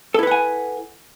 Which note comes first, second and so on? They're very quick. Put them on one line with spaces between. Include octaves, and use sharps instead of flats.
A4 E4 B4 F#5 G#5